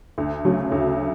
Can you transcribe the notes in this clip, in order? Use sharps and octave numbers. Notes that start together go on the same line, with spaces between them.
D2
C#3 F#3 A3
D2